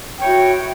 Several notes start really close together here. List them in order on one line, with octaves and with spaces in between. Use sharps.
G5 C#5 E4 F#4